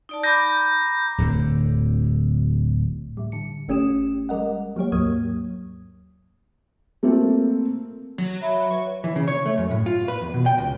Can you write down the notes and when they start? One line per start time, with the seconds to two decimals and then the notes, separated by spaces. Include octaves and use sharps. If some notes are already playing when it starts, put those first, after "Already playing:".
0.09 D#4 D5 A5
0.23 A#5 B5 D6 G6 A#6
1.18 D1 D3
3.17 A2 G3
3.32 D3 C#7
3.68 G1 A3 C#4 G4 D#6 E7
4.29 G3 G#3 A#4 D#5 F#5
4.76 F#3 A#3 G4 C#5
4.92 D#2 G#2 F#3 A#3 D#6 G#6
7.03 A3 A#3 C4 F4 A4
8.18 F#3
8.41 C#5 E5 B5
8.71 B4 C#5 C#6
9.04 E3
9.16 C#3
9.28 C#5
9.46 A3
9.58 F#2
9.71 A2
9.86 F4
10.08 B4
10.21 E2
10.34 B2
10.46 G5
10.58 C#2